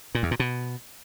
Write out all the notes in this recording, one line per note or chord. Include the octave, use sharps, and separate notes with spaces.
A#2
E2
A#2
B2